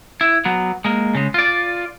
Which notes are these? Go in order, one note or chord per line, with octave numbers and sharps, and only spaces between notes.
E4
F#3 B3
G#3 A#3
C#3 G#3
F4 D5